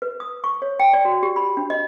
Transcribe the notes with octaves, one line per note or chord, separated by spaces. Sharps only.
B4
D#6
C#6
C#5
G5
D5
F#4
G4
B5
D4
D#5